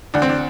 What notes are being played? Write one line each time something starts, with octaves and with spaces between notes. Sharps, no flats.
D2 D4
C4
D4